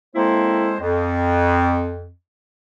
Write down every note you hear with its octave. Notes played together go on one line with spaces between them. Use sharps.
G#3 A#3 C4 E4 A4 C5
F2